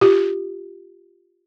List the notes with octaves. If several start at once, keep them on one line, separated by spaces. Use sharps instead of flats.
F4 G4